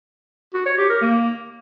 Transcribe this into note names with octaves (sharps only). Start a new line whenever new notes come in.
F#4
C#5
G4
A#4
A#3